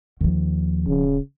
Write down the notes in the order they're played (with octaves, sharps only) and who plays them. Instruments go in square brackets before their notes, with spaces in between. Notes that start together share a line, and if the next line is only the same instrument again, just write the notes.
[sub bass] D#2 [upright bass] D#3 F3
[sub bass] D#1 [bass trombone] C#3